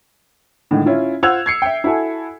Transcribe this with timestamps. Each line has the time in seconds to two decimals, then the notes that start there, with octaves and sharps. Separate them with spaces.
0.71 A2 D3 D#3 G#3
0.86 C#4 E4 F4
1.23 F4 C5 F#5 E6 G#6 F7
1.46 G#6 C7 C#7
1.62 E5 G5
1.84 E4 F#4 A4 G#5